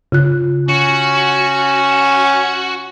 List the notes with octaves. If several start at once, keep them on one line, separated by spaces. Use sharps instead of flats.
C#3 F4 F#6
C#4 F#4